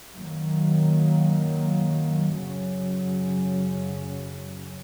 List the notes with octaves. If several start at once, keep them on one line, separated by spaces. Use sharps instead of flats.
F#2 D#3 F#3 A#3
F#2 C#3 F#3 C#4